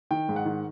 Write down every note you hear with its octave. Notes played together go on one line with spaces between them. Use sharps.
D#3 G5
G#2
F#5
D#3